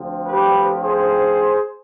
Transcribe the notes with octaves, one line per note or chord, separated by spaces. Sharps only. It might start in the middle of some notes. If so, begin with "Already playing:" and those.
Already playing: D2 D3 F3 C4
G4 B4
G#4 C5